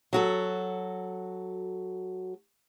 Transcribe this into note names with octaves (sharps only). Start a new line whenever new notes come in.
F#3 F#4 A4